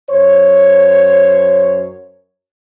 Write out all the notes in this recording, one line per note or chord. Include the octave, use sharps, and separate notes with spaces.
F#2 C5 C#5